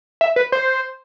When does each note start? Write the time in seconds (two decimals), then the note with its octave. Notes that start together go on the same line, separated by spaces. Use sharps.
0.21 E5
0.36 B4
0.52 C5